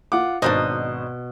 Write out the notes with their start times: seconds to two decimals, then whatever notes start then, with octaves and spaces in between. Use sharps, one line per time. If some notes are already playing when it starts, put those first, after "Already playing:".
0.12 F4 F#5 D6
0.42 G#1 B2 D4 D#4 C5 D#5